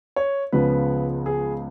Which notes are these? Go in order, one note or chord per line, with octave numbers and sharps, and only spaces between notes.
C#5
C#2 C#3 F3 B3 B4
G#4